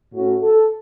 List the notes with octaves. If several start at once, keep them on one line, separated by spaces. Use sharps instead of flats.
A2 A3 C#4 F#4
A4